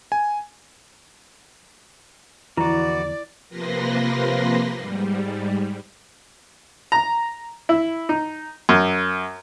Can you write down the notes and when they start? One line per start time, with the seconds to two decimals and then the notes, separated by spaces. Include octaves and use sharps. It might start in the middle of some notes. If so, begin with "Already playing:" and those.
0.12 G#5
2.57 E2 D3 E3 F3 E4 F#4 D5
3.49 C3 F3 A#3 B4 C6 A#6
4.76 G#2 G3
6.92 A#5
7.69 E4
8.09 D#4
8.69 F#2